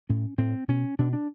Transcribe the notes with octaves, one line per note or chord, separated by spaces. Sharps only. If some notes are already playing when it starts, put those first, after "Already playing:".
A2 C#4
A2 C4
B2 C#4
B2 D4
D4